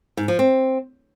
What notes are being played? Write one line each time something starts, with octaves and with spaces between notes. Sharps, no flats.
G#2
F3
C4